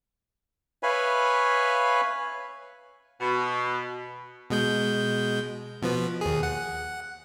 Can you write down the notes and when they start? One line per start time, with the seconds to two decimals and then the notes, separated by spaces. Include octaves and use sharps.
0.83 B4 C#5 E5 F5 G#5 B5
3.21 B2
4.50 B2 G#3 G6
5.82 B2 F3 B3
6.21 D#2 G#4
6.43 F#5